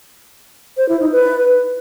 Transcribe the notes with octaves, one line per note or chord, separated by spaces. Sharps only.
C5
E4
D#4
B4